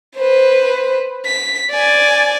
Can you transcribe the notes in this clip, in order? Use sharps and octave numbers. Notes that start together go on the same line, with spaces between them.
B4 C5
B6
D5 G#5